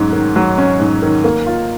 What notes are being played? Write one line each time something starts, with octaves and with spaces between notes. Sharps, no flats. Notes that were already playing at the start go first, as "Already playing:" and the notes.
Already playing: G#2 F#3 C#4
D#3
F#3
C#4
G#2
D#3
A#3
F4